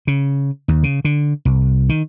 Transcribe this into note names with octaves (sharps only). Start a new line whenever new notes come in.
C#3
D#2
C#3
D3
C2
D#3